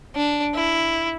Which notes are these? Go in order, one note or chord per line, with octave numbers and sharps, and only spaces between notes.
D4
E4